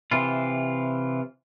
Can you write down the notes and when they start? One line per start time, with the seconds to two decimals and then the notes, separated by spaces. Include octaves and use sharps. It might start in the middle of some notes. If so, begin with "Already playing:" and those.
0.12 C3 E3 F4